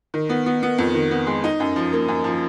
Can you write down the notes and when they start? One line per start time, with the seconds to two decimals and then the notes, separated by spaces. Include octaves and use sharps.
0.14 D#3
0.29 B3
0.46 B3
0.63 B3
0.78 F2
0.95 D#3
1.11 B3
1.27 G#3
1.44 D#4
1.60 F#2
1.76 F3
1.93 A#3
2.08 F#2
2.24 F3